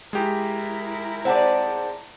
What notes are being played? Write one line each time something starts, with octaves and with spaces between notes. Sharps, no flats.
G#3 E4 G4 A#4
C4 G#4 C5 D5 F#5 A5